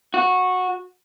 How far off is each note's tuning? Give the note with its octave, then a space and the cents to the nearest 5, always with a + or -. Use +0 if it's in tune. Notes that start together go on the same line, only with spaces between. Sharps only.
F#4 -15